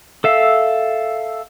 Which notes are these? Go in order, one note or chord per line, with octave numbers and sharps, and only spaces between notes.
A4 E5 F5